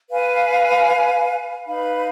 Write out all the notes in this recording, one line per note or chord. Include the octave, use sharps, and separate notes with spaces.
B4 F5 G#5
D#4 B4 F5 B5